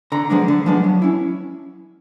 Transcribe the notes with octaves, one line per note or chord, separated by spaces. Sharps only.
D3 A#5
F3 G#3 B3 D4
D3
F3 G#3 B3 D4
F#3
C#4 E4